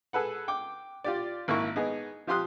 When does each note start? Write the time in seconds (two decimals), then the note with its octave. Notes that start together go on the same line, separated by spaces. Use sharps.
0.13 G#4 A4 B4 F#5
0.48 G5 D6
1.04 F4 G4 D5
1.48 G#1 A#3 E4 A#4 C#6
1.76 B3 D#4 G#4
2.27 F3 F4 G4 C6 D#6 F#6